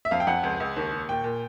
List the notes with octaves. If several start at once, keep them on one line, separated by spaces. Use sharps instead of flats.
E5
F2 F5
G5
F2 F#5
C#2
C#2
D#2
D#2
A#2 G5
A#2